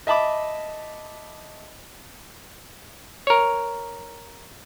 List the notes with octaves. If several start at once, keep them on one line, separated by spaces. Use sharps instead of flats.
D#5 E5 A5 B5 D6
A#4 C#5